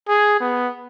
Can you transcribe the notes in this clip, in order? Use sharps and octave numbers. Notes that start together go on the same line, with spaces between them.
G#4
B3